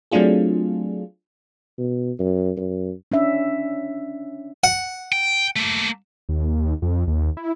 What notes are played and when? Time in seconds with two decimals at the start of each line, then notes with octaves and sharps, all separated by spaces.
0.11 F#3 A3 C4 D4 F4 G#4
1.78 B2
2.19 F#2
2.57 F#2
3.12 C#4 D4 E5
4.64 F#5
5.12 G5
5.56 A3 A#3
6.29 D#2
6.82 F2
7.07 D#2
7.37 E4